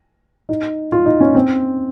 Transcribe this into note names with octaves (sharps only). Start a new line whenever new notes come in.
D#4
F4
D#4
C#4
C4